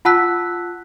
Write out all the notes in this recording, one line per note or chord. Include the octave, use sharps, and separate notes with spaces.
F4 F#5 A5 E6 F#6 B6